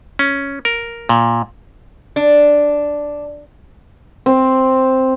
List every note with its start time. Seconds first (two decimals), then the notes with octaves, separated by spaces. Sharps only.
0.19 C#4
0.65 A#4
1.09 A#2
2.16 D4
4.26 C4